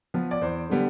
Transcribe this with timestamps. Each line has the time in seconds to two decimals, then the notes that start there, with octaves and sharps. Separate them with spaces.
0.14 F3 B3
0.31 D5
0.41 E2 C5
0.69 D3 G3 B3